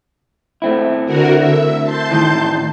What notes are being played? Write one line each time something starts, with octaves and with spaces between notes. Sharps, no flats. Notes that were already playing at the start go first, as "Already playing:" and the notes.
A3 C4 E4
D3 F#4 A#4
E5
A5 C6 G6
A2 D#3 E3